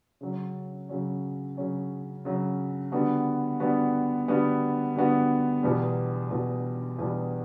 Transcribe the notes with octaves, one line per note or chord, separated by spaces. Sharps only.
C#3 F#3 C#4
C#3 F#3 C#4
C#3 F#3 C#4
C#3 F#3 C#4
D3 G3 B3 F#4
D3 G3 B3 F#4
D3 G3 B3 F#4
D3 G3 B3 F#4
E2 B2 G3
E2 B2 G3
E2 B2 G3